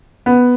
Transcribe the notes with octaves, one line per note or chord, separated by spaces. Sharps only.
B3